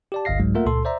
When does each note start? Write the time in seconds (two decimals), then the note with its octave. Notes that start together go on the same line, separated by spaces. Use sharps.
0.12 G4 D5 A5
0.25 G1 C#2 D#5 F5 A#6 C7
0.40 C2 G#2 F#3 G#3
0.54 A3 A#3 F4 A#4 E5 F#5
0.66 C#2 A#2 A4 C6
0.85 C5 D5 E5 A#5